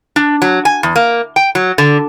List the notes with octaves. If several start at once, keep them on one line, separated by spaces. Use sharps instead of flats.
D4
F#3
G#5
E2
A#3
G5
F#3
D3